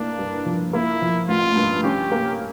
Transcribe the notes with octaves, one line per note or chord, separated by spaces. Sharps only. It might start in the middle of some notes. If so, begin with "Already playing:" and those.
Already playing: A#3 D4 E4
G2
F3
A#3 E4
F3
A1 F4
G2
C#4 G4
A#3